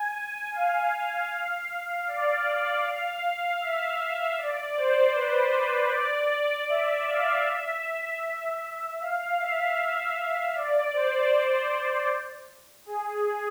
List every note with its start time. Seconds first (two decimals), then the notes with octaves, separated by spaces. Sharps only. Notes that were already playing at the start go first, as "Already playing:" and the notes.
Already playing: G#5
0.52 F5
2.07 D5
2.84 F5
3.22 F5
3.60 E5
4.38 D5
4.77 C5
5.15 B4
5.93 D5
6.69 E5
7.07 F5
7.47 E5
9.00 F5
9.40 E5
10.55 D5
10.93 C5
12.86 G#4